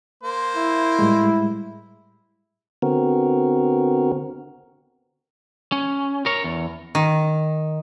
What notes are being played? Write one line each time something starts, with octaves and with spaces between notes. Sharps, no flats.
A#3 C5
E4
A2 G3 G#3
D3 B3 C4 F#4 A#4
C#4
A#4 C#5
E2
D#3